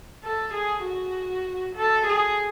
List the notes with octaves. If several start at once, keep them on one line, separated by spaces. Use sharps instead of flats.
A4
G#4
F#4
A4
G#4